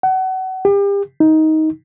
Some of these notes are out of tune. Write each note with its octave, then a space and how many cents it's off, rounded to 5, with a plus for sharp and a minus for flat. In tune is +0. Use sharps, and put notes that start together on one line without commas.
F#5 +30
G4 +35
D#4 +15